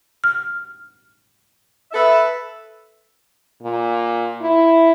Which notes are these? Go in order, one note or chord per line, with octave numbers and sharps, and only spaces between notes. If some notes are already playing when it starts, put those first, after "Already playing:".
F6
A4 B4 E5
A#2
E4